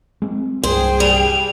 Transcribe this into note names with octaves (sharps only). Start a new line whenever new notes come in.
G#3 C4
C2 G2 G#4 C5 G5
G3 F7